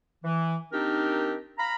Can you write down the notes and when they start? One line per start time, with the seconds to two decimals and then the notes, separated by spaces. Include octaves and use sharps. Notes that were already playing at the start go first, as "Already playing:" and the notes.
0.23 E3
0.72 D#3 C4 D4 D#4 G4 A#4
1.58 F5 A#5 B5